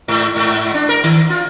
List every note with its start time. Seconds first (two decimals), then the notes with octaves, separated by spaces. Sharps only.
0.08 G#2
0.36 G#2
0.74 D4
0.89 A#4
1.03 D#3
1.30 F4